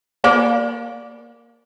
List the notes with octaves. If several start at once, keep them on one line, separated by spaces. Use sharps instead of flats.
A#3 D5 B5